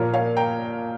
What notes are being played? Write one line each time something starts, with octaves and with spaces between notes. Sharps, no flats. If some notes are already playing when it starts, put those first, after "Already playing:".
Already playing: A#2 F3 A#3 F4 A#4 C#5
C#5 F5
G5 A#5